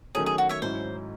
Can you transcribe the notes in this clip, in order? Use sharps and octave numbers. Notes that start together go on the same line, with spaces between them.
D#3 F#3 A3 C#4 G#4
G#4
F#4
C#5 E5
G#2 F#3 C#4 E4 C5